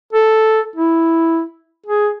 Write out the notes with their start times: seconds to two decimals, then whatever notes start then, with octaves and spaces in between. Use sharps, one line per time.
0.13 A4
0.76 E4
1.86 G#4